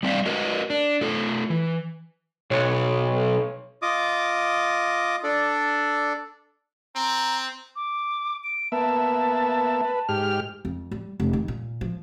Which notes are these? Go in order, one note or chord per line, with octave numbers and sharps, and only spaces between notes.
G3 C4 D5 E5 F5
F#4 A#4 B4 D#5
D4
A3 F4 A4
E3
B1 C#5
F4 D#5 D6 D#6
D4 A4 D5
C4 A#5
D6
D7
A#3 B3 E5 A5
B4
G#2 G4 F6
F2
G3
F1
D#3
A#2
F3